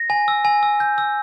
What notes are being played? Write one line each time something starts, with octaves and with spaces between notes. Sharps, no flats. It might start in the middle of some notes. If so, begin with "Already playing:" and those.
Already playing: A#6
G#5
E6
G#5
E6
G6
E6